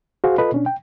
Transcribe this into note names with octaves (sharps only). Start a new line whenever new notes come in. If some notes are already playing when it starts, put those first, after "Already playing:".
F#4 G#4 C5 F5
F4 A4 B4 D#5
B2 C#4 D4
G5